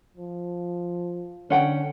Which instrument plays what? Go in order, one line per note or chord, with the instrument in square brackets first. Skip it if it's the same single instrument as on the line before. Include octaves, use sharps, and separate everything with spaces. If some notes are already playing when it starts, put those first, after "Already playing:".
[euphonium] F3
[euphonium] D3 [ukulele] C#4 F#5 G5